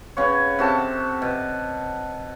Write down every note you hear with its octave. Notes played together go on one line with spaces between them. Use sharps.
C#3 B3 C#5
C3 F#4 A4 A5
B2